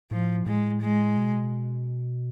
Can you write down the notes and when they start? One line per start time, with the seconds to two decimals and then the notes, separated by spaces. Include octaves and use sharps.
0.11 A2 F3
0.46 A2 G#3
0.82 G#3
1.17 B2